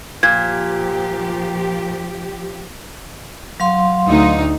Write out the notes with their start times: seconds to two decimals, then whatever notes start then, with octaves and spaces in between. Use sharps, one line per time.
0.23 A#2 F3 G4 G#6
3.60 F#3 F5 C6
4.07 D2 D#4